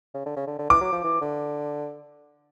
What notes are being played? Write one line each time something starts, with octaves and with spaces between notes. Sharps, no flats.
C#3
D3
C#3
D3
D3
E3 D6
F#3
F3
E3
D3